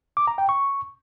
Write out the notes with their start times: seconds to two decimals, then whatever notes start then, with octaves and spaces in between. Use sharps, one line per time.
0.17 D6
0.27 A#5
0.38 G5
0.49 C#6